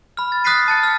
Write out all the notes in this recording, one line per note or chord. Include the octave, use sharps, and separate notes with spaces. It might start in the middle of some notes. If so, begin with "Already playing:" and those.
B5 F6
A6
D#6 F#6 A6 B6 C7 D#7
A5 A6 C#7
F6